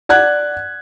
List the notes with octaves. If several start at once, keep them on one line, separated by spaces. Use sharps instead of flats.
D5 F#5 F#6 G#6